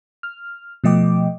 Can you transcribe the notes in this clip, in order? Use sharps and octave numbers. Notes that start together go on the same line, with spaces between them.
F6
B2 F3 A3 D#5 G5 D6